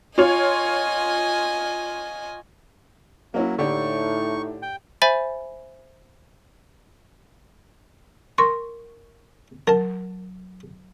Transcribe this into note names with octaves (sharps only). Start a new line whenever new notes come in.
F4 C#5 D#5 G#5
F#3 A#3 C#4 E4
A2 D3 D#4 G4 D5 C#6
G5
C5 E5 G#5 B5 A6
A#4 C6 C#6
F#3 A#4 A5